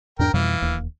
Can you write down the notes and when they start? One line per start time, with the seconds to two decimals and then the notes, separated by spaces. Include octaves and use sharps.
0.19 E2 G#2 D4 A#4 G5
0.34 F2 B2 E3 G3 F5
0.62 D1 D#2